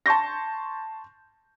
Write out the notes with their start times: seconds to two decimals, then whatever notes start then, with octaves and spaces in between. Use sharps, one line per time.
0.06 A5 C6 C#6 G6 A#6